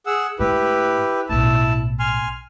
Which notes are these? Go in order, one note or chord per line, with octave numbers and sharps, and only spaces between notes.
G#4 F#5 E6
G#2 A3 E4 G4 B4
B1 A2 E4 A5
G#5 C6 F6